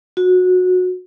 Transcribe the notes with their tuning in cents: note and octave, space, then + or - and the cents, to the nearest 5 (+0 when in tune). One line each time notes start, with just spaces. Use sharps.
F#4 -20